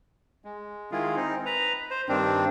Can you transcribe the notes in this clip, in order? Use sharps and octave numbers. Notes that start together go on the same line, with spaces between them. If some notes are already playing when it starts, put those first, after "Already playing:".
G#3
D#3 G#3 E4 F4 G#4
C4 D#4
B4 A#5
C5
G2 D#3 C4 D4